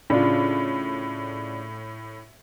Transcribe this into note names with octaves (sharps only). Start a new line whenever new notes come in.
A2 C#3 D4 F4